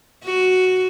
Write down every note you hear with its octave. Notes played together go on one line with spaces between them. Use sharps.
F#4